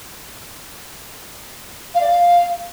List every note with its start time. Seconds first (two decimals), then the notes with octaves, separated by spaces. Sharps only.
1.95 F5
2.01 D5
2.07 F5